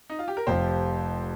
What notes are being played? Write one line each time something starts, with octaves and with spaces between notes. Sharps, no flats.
D#4
F4
G4
A#4
F1 F2 F3 G4 C5